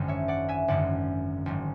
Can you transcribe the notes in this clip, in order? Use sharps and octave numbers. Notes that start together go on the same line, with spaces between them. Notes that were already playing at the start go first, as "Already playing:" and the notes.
Already playing: G#1 F#2 D3 G#3
C#5 E5
D5 F#5
E5 G#5
G#1 F#2 D3 G#3 D5 F#5
G#1 G#2 F#3